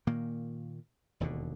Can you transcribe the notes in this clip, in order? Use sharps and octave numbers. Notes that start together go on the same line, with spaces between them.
A#2 D#3 A#3
E1 D#2 B2 D3